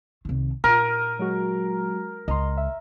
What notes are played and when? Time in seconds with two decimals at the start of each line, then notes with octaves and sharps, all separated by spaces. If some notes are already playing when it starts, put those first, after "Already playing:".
0.25 C2 D#3
0.64 A#2 A#4 F6 D#7
1.19 F#3 G#3 F#4
2.28 C#2 D#5 A#5 C6
2.58 E5